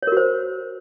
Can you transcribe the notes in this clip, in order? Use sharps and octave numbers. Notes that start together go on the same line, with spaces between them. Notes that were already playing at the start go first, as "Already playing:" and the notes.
F#4 A#4 C5 C#5